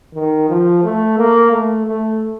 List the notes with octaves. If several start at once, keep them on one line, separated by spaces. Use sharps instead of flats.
D#3
F3
A3
A#3
A3
A3